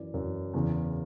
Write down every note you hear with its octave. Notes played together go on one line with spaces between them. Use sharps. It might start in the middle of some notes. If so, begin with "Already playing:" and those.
Already playing: F#2 E3 D5
F#2 E3
E2 C#3 E3